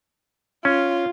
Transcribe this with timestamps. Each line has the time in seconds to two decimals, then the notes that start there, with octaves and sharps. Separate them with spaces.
0.65 C#4 F4